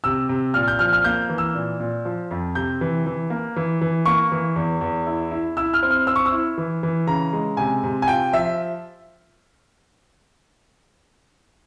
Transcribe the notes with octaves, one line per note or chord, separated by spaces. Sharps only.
C3 E6
C3
A#2 F6
G6
F3 F6
F6
A#3 G6
E3
E6
A#2
A#2
F3
F2
C3 G6
E3
E3
A#3
E3
E3
A#3 C#6
E3
E2
E2
E4
E4
E4 E6
F6
C4
F6
C4 E6
C#6
E6
E4
E3
E3
C#3 A#5
G#3
C3 G#5
C3
G#5
F4 G5
F3 E5